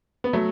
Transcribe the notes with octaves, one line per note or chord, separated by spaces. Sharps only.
B3
F#3 A3